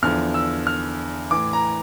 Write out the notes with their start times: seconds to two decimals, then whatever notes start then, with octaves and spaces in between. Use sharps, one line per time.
0.02 E2 D3 F3 F6
0.34 E6
0.67 F6
1.31 A2 E3 D6
1.53 A#5